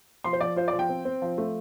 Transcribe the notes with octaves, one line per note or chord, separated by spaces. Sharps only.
F3 C6
C5
F3 D5
F4 C5
D5
F3
G5
C4
C4
F3
A3